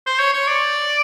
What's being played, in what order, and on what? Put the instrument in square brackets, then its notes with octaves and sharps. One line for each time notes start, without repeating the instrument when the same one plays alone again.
[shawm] C5
C#5
C#5
D5